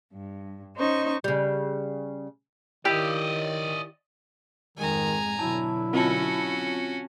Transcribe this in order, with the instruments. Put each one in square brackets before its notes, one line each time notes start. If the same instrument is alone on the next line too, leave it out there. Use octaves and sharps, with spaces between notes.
[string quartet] G2
C#4 D#4 C5 D#5 C#6
[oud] C#3 G3
[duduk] D#3 [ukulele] E4 G4 [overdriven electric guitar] D5 D#5
[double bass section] F2 G#2 G#3 [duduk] D#3 [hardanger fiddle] G#5 A#5
[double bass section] B2 D3 F#3 [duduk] E4 [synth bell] A5
[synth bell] C4 F4 A5 [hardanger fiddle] C#4 F#4